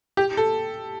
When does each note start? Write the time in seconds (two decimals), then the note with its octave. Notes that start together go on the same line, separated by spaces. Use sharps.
0.17 G4
0.37 A4